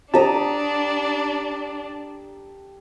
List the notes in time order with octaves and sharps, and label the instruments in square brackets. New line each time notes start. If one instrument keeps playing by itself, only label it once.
[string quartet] D4 [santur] G4 A#5 D#6 [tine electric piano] A5